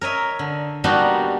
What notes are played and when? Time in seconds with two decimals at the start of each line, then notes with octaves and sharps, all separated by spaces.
0.01 A#4 C#5 D#5 E5
0.39 D3
0.84 G3 A#3 B3 D4 D#4 F#4